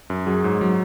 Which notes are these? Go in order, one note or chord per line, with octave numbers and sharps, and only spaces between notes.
F#2
F#3 G#4
G#2
F#3